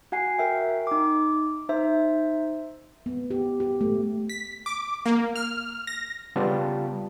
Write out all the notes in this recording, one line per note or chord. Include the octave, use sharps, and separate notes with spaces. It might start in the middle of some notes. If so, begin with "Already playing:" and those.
F#4 F#5 G#5 C7
F#4 A#4 E5 G5
D#4 D6
D#4 C5 E5
B3
G4
G4
A3
B6
D6
A#3
F6
A#6
C#3 G3 B3 F4 A5